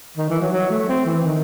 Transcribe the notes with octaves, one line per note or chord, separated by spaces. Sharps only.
D#3
E3
F#3
F#3
A3
C4
E3
D#3